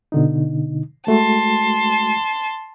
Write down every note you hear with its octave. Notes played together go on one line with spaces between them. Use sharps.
B2 D3 D#4
G#3 A3 F#4 A5 C6